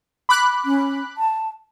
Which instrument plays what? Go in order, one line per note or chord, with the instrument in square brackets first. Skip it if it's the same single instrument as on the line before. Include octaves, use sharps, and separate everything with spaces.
[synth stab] B5 D6 F#6
[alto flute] C#4
A5